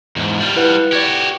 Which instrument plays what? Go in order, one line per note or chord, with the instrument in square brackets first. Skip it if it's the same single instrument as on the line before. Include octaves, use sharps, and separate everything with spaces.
[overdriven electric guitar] E2 G#2
G3 F4
[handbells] E4 B4 F#5
[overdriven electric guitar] F#4 G4 [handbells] D5 G#6